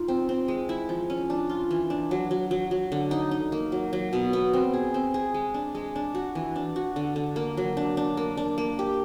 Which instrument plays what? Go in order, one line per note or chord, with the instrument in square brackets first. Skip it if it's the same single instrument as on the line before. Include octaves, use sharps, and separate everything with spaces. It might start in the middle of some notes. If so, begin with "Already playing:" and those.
Already playing: [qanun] D#4 F4
C4
C4
G#3
E4
F3
C#4
D4
F4
E3
D4
F#3
F#3
F#3
F#3
D3
D#4
D#4
A#3
F#3
F#3
B2
B3
C4
G#4
C4
G#4
G#3
D4
G#3
D4
F#4
E3
D4
F#4
D3
D3
A#3
F#3
D4
D4
A#3
D4
A#3
G4